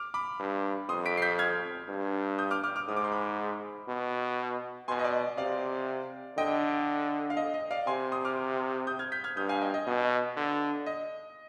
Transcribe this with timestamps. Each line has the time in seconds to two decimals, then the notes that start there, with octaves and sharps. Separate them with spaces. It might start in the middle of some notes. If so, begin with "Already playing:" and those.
Already playing: D6 F6
0.14 B5 D6
0.40 G2
0.89 F2 C6 D#6
1.06 B6 D7
1.18 C7
1.22 G6 B6
1.39 F6 G#6
1.89 G2
2.38 D#6 G6
2.51 D6 F6
2.64 D6 F6
2.76 D6 F6
2.88 G#2 D#6
2.96 D6
3.04 C6
3.12 B5 D6
3.88 B2
4.88 B2 G#5 C6
4.99 D#5
5.04 D5
5.37 C3 D5 F5
6.38 D3 D#5 G5
7.30 F5
7.37 D#5
7.54 D#5
7.71 D5 F5
7.87 C3 G#5 C6
8.12 C6 D#6
8.25 D6 F6
8.87 D#6 G6
8.99 F6 G#6
9.12 G6 B6
9.24 F6 G#6
9.37 G2 D#6 G6
9.49 F5 G#5
9.61 D#5 G5
9.74 D#5
9.87 B2 D#5
10.36 D3
10.86 D#5